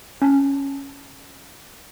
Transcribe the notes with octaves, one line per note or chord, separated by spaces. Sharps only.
C#4 G#5 A5